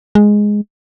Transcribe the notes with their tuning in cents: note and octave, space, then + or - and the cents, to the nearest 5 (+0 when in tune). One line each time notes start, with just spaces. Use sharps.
G#3 +0